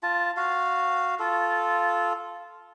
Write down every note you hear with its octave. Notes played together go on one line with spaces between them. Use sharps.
F4 A5
F#4 F5
F4 A4